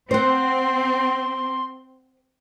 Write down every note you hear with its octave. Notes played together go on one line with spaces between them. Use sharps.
C4 C5 F#5 C6